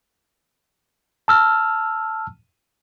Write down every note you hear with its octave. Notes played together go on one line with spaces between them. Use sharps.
A5 E6 F6